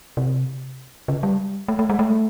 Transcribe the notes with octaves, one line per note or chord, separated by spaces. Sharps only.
C3
C#3
G3
A3
A3
G#3
A3